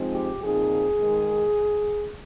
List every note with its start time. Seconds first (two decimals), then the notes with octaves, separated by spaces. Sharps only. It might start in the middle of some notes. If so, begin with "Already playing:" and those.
Already playing: F3 G#3 C4 D#4
0.14 G4
0.43 A#2 F3 C4 D#4 G#4
0.99 D#3 G#3 D#4